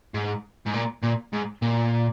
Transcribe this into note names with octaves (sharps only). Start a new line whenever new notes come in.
G#2
G#2
A#2
A#2
G#2
A#2